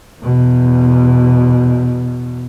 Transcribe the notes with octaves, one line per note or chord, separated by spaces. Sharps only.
E2 B2